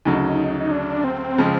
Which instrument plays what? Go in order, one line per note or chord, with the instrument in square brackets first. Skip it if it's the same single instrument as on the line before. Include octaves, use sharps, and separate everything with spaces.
[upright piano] D2 C#3 F#3 [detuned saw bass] D#4
[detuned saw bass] D#4
D4
C4
[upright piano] C#3 F3 G#3